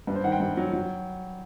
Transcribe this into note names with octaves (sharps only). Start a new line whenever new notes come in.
G2 B4
C5
D#3 F#5
G5
G2
F#3
F#3